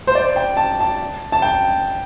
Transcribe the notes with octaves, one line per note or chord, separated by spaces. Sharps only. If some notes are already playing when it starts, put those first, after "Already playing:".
C5
D5
G5
A5
A5
A5
G5